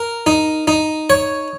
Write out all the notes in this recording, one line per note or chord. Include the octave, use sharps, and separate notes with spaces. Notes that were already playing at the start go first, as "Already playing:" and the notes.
Already playing: A#4
D#4
D#4
C#5